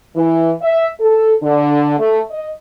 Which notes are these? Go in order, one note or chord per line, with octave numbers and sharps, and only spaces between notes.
E3
E5
A4
D3
A3
D#5